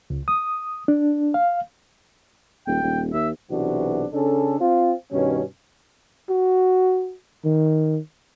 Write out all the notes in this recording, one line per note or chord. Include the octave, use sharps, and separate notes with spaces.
C#2
D#6
D4
F5
D#1 G5
D#1
D#2 E5
B1 C3 E3 D4 F#4
C#3 C#4 D4 A4
C4 F4
G2 B2 D#3 C#4
F#4
D#3